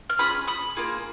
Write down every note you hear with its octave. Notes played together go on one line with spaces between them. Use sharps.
F6
C#4 F4 G#4 B5 D#6
B5 D#6
A#3 F4 G#4